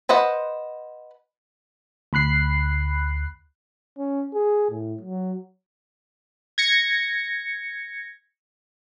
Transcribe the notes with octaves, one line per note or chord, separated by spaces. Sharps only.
B4 C5 D#5 F#5
D2 B5 F#6 C7
C#4
G#4
A2
F#3
G#6 A#6 C#7